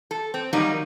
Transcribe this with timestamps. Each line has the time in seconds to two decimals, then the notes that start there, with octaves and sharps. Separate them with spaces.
0.11 A4
0.34 C4
0.53 D#3 F#3 G3 A#3 D#4